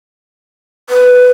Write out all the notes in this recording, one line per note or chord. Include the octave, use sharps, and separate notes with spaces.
B4